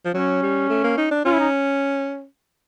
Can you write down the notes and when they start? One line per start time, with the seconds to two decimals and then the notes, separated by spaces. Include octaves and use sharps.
0.05 F3
0.14 F#3 C#4
0.42 G3
0.69 A3
0.84 A#3
0.97 D#4
1.11 D4
1.25 C#4 F4
1.33 E4
1.40 D#4